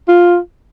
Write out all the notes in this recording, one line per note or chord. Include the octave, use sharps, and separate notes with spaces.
F4